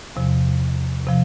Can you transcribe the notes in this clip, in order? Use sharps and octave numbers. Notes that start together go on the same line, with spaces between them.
E2 C3 F3
C3 F3